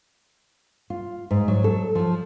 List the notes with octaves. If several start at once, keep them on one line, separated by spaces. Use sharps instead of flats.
F4
G#2
F#3
A4
F3